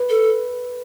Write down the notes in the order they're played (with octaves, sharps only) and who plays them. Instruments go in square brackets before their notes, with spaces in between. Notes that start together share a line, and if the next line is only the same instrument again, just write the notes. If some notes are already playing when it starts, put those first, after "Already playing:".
Already playing: [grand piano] B4
[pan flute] A4